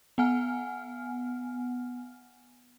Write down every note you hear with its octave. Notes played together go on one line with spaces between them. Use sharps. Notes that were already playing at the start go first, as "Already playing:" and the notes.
B3 F#5 G#5 F6